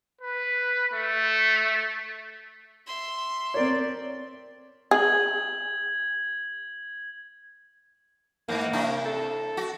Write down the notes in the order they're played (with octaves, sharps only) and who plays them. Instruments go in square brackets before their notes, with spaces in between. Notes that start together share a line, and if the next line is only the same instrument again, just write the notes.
[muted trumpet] B4
A3
[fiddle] E5 C6
[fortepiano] C4 A#4 C#5 [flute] D5
[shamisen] G#4 [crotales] G#6 F#7
[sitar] G#2 E3 [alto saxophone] A#3
[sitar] C3 D4 E4
[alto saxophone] A4
[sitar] F#4